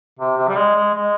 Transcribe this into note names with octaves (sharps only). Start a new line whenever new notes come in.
C3
C3
G3
G#3
G#3
G#3